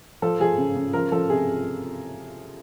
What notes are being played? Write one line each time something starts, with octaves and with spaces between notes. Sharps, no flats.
F3 A4
F3 G#4
C#3
C#3
F3 A#4
F3 A4
C3 G#4